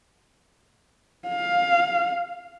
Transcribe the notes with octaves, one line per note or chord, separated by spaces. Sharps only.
F5